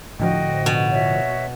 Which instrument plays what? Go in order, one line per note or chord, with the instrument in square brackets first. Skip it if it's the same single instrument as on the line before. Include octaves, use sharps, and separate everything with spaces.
[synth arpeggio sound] A2 D3 F3 [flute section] F#4 D#5 G5
[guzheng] B2
[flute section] F#4 C#5 E5